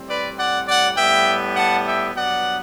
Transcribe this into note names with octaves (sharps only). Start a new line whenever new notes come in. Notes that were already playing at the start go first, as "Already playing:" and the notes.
Already playing: A2 G3 C4
B4 D5
D5 F#5
D5 F#5
A2 G3 B3 E5 G5
F#5 A5
E5 G5
G2 F#3 B3 D5 F#5